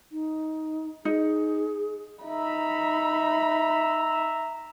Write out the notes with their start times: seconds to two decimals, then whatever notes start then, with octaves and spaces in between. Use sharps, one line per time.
0.12 D#4
1.05 D#4 G#4
2.23 D#4 E5 A#5 B5